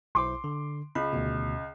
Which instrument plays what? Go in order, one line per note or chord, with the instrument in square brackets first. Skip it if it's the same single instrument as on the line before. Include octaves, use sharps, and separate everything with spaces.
[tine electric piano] B1 E4 C5 [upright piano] C6 D6
[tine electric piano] D3
[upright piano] C#2 [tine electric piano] B5
[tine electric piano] D2 B2